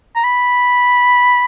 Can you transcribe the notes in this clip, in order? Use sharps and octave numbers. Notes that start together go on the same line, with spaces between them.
A#5
B5